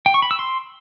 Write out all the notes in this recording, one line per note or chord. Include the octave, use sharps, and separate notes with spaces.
G5
C#6
B5
E6
C6